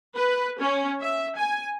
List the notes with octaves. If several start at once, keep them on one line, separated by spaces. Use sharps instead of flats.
B4
C#4
E5
G#5